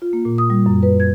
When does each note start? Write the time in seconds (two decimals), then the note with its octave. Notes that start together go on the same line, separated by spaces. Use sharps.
0.02 F4
0.13 A#3
0.25 A#2
0.38 D#6
0.50 G3
0.66 F#2
0.83 B4
1.00 G#6